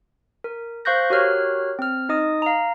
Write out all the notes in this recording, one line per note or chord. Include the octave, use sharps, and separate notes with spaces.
A#4
C5 F5 C#6 F#6 G6 A#6
F#4 G4 A#4 C#5 F6 F#6
C4 F6
D#4 D#5 D#6
F5 A#5